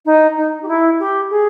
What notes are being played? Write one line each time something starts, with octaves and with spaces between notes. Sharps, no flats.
D#4
D#4
G4
E4
G4
G#4